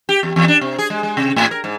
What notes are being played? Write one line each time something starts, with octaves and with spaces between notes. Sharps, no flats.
G4
E2
E2
D4
C3
G#4
G#3
G#3
C3
A2
A#4
G#2